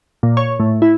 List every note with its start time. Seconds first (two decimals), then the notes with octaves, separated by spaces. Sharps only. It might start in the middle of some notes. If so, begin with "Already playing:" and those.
0.23 A#2
0.37 C#5
0.60 A2
0.82 E4